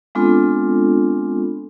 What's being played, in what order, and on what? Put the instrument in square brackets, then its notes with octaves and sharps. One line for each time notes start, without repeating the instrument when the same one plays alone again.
[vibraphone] G#3 B3 C4 D4 F4 A4